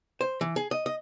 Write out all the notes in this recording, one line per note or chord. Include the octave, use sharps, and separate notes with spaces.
C5
E3
G#4
D#5
D#5